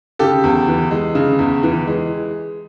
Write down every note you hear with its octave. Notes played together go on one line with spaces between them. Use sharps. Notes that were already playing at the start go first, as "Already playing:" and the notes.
C#3 G4 A4
E2
E3
G#3
C#3
E2
E3
G#3